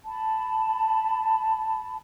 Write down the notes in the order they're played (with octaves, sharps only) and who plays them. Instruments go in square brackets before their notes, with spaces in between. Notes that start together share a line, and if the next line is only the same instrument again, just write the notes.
[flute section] A5 B5